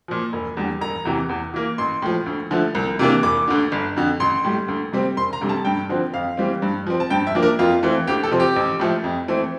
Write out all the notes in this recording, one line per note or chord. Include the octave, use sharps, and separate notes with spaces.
A#2 F3
E1
E2 D3 G3
E1 A#5
E2 C3 E3
E2
E3 A#3
A1 C6
A2 F3
D2
D3 F3 A3
C2
C3 E3 A#3 D4
E1 D6
D2 D3
G1
F2 D3
A1 C6
A2 G3
D2
C3 G3 C4
E1 C6
A#5
D2 C3 G3
A5
G2 G5
D3 F3 C4
F2 F5
E3 G3 C4
G2
F3 C4
A5
G2 G5
E5
F3 A#3 D4
A#4
F2 F4
E3 A3 C4
D2 G4
A4
C3 F3 C4
G4
A1
A2 F3 A3
F2
E3 A3 C4